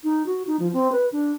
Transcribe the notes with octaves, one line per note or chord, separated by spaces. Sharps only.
D#4
F#4
D#4
F3
C4
B4
D4